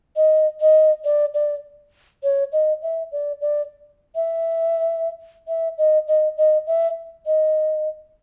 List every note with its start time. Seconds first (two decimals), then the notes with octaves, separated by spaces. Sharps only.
0.16 D#5
0.61 D#5
1.05 D5
1.34 D5
2.23 C#5
2.52 D#5
2.83 E5
3.12 D5
3.41 D5
4.15 E5
5.48 E5
5.78 D#5
6.08 D#5
6.37 D#5
6.67 E5
7.26 D#5